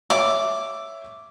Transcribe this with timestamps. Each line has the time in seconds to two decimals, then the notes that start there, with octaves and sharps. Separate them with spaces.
0.10 C#5 E5 D6